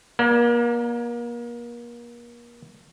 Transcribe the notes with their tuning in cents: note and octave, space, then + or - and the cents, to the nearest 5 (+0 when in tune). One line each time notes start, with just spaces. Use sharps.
A#3 +35 D5 +0 A#5 +0